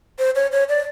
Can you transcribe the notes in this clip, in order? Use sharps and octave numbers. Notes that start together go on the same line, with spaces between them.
C5
C#5
C#5
D5